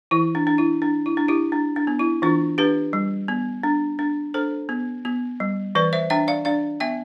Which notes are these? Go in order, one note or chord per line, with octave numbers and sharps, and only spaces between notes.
E3 E4
D4
D4
E4
D4
E4
D4
E4 G4
D4
D4
B3
E4
E3 D4 F4
D4 G4 B4
G3
B3
D4
D4
D4 A4 C5
B3
B3
G3
E3 B4 D5
C5 E5
D4 E5 G5
D5 F5
D4 D5 F5
B3 E5 G5